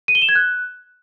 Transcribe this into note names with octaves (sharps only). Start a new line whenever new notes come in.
D#7
G7
E7
G#6
F#6